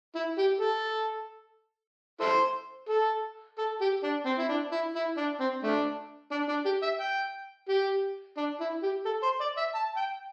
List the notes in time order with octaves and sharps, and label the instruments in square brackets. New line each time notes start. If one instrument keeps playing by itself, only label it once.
[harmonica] E4
G4
A4
E4 A4 C5
A4
A4
G4
D4
C4
E4
D4
E4
E4
D4
C4
A3 D4
D4
D4
G4
E5
G5
G4
D4
E4
G4
A4
C5
D5
E5
A5
G5